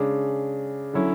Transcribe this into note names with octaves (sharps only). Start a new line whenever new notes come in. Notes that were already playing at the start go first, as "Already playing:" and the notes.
Already playing: C#3 G#3 D4
D3 F#3 C#4 E4